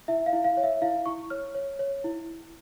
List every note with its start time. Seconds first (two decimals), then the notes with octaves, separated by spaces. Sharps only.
0.08 E4 E5
0.26 F5
0.33 E4
0.44 F5
0.57 C#5
0.63 E5
0.82 E4 F5
1.06 E4 C#6
1.30 C#5 F6
1.55 C#5
1.79 C#5
2.04 E4